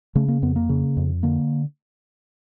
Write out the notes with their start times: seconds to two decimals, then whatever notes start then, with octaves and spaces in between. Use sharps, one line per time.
0.15 C#3 A3
0.28 A#3
0.42 F2 B3
0.56 A#3
0.69 C#3
0.97 F2
1.23 D3 A#3